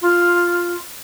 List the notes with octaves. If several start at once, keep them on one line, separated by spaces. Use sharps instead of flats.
F4